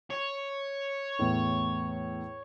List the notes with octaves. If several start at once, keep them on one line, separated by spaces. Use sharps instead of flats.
C#5
E2 A2